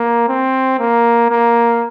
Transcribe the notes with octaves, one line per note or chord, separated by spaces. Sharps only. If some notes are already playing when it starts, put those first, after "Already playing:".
Already playing: A#3
C4
A#3
A#3